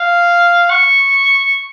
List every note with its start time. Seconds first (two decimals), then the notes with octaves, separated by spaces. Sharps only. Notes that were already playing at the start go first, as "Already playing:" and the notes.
Already playing: F5
0.70 C#6